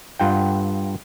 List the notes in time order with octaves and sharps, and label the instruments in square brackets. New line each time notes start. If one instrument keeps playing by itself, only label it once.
[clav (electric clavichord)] G2 F4 F#5 G5